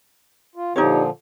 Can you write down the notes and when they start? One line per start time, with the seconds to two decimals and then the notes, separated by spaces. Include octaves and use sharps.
0.56 F4
0.76 A#2 D3 F3 D#4 G4 C#5